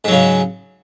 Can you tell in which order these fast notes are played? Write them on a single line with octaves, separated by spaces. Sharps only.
G#2 F#3 C#3